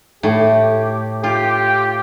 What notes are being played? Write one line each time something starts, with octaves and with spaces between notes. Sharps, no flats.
A2 G4
F4 G4